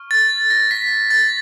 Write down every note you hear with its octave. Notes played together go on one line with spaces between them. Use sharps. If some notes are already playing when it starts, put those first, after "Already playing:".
Already playing: C#6 F6
A6
A#6
B6
A6